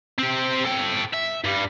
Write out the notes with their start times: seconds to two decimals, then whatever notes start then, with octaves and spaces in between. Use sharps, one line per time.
0.18 C4 G4
0.66 A4 G5
1.14 E5
1.45 G2 G3